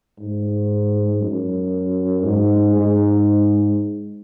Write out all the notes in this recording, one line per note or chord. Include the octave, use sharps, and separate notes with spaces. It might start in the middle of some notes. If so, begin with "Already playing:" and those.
G#2
F#2
G#2
G#2